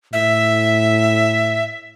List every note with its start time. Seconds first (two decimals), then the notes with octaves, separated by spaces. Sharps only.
0.13 A2 E5